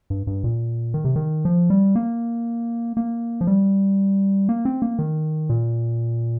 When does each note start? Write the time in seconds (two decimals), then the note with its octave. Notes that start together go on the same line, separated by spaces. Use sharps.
0.10 G2
0.27 G2
0.44 A#2
0.94 D#3
1.05 C3
1.16 D#3
1.45 F3
1.70 G3
1.95 A#3
2.97 A#3
3.41 F3
3.47 G3
4.49 A#3
4.65 C4
4.82 A#3
4.99 D#3
5.49 A#2